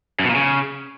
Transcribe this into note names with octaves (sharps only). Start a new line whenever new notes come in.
F#2
B2
A#2
C#3